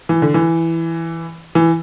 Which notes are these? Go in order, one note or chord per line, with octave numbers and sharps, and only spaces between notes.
E3
D3
E3
E3